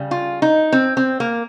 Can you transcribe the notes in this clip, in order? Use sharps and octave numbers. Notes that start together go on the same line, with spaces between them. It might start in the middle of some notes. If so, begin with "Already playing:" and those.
Already playing: C#3 G3
F4
D#4
C4
C4
A#3